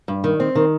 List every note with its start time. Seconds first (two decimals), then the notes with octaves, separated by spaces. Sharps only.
0.08 G2
0.24 D#3
0.40 C4
0.55 D#3